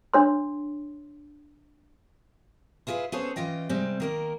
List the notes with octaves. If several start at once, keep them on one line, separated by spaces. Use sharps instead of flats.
D4 C#5 C6
E4 F4 G#4 A#4 B4
B3 C#4 G#4 A4 C5 C#5
E3 C#4 F4 D#5 G5
C3 G3 G#3 C4
D#3 A#3 A#4